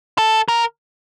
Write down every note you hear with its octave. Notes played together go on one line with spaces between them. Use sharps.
A4
A#4